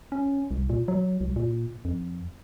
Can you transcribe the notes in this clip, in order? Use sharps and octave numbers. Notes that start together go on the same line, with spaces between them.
C#4
C2
A#2
F#3
C2
A#2
F2